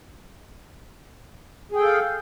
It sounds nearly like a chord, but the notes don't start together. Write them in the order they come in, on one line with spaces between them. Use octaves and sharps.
G#4 G5 A4 F5